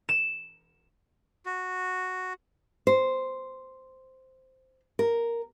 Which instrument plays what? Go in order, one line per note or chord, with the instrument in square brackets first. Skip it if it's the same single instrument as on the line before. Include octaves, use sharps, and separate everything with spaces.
[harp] E7
[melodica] F#4
[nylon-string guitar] C5
A#4